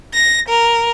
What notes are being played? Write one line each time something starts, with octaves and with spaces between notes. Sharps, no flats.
A#6
A#4